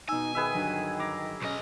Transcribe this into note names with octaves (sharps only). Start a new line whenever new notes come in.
B2 D#4 G#5 E6
D#3 G#4 B4 E5
G2 D3 F#3
A#5 D6
B1 C#4 D#5